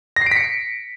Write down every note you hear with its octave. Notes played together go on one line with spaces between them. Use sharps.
A#6
C7
D7
B6
C#7